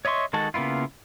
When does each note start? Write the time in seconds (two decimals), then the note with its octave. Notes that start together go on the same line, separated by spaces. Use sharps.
0.05 C#5 D#5 E5 C6 C#6
0.33 D#3 G#3 F#4 A4 A5
0.54 C#3 A#3 B3 E4 F4